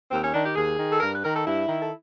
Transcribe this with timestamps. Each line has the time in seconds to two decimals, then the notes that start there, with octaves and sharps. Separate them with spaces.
0.11 D#2 C4
0.22 C#4
0.33 D#3 D4
0.44 G4
0.56 D#2 G#4
0.78 D#3
0.91 A4
1.00 G2 A#4
1.12 B4
1.23 D#3 A#4
1.34 A4
1.45 G2 E4
1.67 D#3
1.82 A4